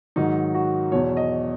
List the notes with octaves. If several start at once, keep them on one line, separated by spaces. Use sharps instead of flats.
G#2 D#3 F#3 D#4
F#4
E2 B2 F#3 C#5
D#5